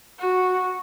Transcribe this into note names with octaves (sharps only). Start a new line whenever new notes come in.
F#4